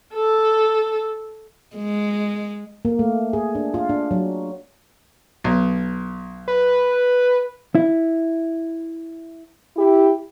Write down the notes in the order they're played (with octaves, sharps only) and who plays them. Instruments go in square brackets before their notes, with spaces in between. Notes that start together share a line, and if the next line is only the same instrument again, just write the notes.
[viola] A4
[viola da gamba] G#3
[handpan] A#3
A3
G#4
D4
F4
D4
F#3
[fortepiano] B1
[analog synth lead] B4
[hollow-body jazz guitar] E4
[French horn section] E4 G4